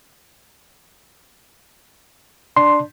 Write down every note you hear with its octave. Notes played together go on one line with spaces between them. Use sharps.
D4 C6